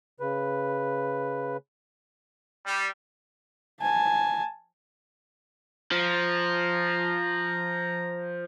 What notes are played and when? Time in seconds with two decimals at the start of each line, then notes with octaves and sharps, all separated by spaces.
0.20 C#3 B4
2.65 G3
3.82 G#5 A5
5.92 F3 A#5